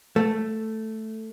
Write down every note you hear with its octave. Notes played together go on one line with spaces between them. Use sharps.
A3